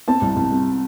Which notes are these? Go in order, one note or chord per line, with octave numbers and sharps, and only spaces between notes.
C4 A5
C2
C2
C3